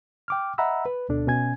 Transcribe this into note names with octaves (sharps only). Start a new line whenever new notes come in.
G5 D6 F6
D#5 E5 F#5 A#5 B5 E6
B4
D2 B2 D4 A4
B2 C#4 G#5 G#6